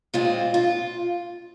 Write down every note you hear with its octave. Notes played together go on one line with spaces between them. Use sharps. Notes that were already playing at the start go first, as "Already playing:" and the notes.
A#2 G#3 C4 F4
F4